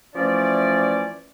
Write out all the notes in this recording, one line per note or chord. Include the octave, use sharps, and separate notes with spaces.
E3 F3 A3 C#4 D5